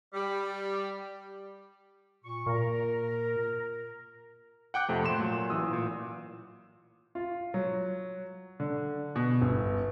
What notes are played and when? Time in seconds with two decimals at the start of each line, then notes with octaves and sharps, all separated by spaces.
0.14 G3
2.24 A#2 C#6
2.46 A#2 A#4
4.74 F#5 G5 D6 F#6 G6
4.89 F2 C3 A3
5.03 A#2 C6 E7
5.19 A#2 F#3
5.50 A1 E3 D#6 E6
5.73 A#2
7.15 F4
7.54 F#3
8.60 D3
9.16 B2
9.42 G1